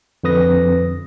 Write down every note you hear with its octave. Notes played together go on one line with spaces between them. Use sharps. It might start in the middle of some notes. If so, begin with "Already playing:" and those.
F2 D3 B4 D#6 A#6